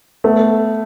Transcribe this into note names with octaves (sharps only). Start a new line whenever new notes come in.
A3 B3